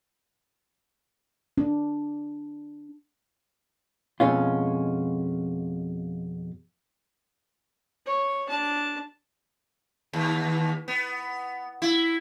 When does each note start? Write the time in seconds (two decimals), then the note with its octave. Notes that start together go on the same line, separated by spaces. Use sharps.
1.58 D4
4.20 F2 B2 G#3 C#4 F4
8.06 C#5
8.49 D4 A5
10.13 D#2
10.88 B3
11.82 E4